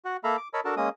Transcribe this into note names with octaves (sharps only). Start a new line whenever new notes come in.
F#4 F#5
A#3 A4 E5 F5 A#5 B5
D6
A#4 C#5 D#5 A5 B5 E6
D4 F#4 A4 A#4 A5
G#3 A#3 C#4 D#5 D#6